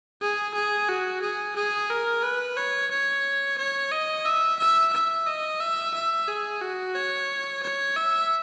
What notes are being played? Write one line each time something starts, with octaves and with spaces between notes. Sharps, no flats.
G#4
G#4
F#4
G#4
G#4
A#4
B4
C#5
C#5
C#5
D#5
E5
E5
E5
D#5
E5
E5
G#4
F#4
C#5
C#5
E5